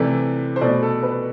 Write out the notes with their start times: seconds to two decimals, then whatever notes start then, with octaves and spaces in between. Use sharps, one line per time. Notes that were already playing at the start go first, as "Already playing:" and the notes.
Already playing: C3 E3 A3 D5
0.56 C5
0.61 B2 A3 D5
0.83 A4
1.03 B4